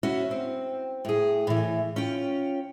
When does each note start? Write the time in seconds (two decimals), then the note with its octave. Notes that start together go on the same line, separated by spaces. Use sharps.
0.03 C#4 E4 F#4
0.31 C4
1.05 A2 G#4
1.47 A2 E3
1.96 C#4 F4 G5